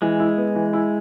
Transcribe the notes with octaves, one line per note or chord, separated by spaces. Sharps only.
E3 G#3
E4
B3
E3
E4